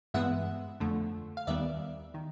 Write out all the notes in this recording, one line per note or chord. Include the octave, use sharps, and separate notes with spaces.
G2 E3 G#3 B3 E5 F#5
F2 D3 F3 A3
F5
D#2 D#3 G3 B3 D5 E5
D#3